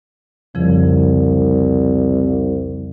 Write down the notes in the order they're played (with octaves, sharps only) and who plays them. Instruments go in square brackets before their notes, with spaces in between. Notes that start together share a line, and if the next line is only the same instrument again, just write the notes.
[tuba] C2 [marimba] F2 C#3 F3